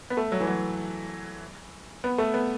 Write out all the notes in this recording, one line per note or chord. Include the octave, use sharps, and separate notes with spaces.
B3
A3
F#3
E3
F#3
B3
A3
B3